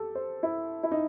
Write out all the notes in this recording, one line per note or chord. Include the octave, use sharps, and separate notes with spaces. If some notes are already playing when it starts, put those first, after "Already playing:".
Already playing: G4 A4
C5
E4
E4
D#4